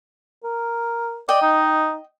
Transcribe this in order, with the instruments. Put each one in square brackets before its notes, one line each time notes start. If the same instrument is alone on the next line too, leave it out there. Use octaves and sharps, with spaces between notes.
[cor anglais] A#4
[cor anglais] D5 [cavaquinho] D#5 G5
[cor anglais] D#4